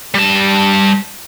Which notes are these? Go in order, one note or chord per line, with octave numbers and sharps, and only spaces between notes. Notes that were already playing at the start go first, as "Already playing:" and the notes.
G3 A5